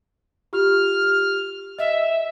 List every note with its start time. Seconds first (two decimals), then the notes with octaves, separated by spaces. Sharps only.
0.53 F4 G4 F6
1.79 D#5 E5